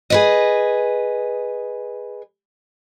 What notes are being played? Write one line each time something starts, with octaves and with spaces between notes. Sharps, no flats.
G#4 B4 D#5